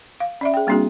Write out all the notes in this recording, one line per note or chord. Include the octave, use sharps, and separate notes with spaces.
F5
C#4 D5 E5
G#4 G5
G3 A#3 C4 D4 F#4 G#4